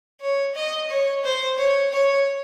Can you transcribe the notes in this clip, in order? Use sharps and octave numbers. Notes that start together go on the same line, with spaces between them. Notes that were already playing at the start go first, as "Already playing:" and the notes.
C#5
D#5
C#5
C5
C#5
C#5